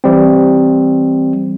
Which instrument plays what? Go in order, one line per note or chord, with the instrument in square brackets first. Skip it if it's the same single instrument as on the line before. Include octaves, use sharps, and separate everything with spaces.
[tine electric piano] E3 G3 C4